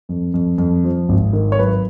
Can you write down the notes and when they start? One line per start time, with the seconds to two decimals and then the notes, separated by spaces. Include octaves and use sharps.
0.09 F2
0.34 F2
0.58 F2
0.84 F3
1.09 G#1
1.33 D#3
1.52 C#5
1.59 F#3 B4